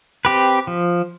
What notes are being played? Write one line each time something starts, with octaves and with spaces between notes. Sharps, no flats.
C4 G4 B4
F3